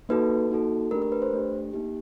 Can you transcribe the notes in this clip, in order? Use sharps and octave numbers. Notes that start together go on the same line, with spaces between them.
A#3 D#4 F#4 A4 B4
A#3 D#4 F#4 A4
A3 D4 G4 A#4
A#4
B4
C5
A3 D4 G4
A#3 D#4 G4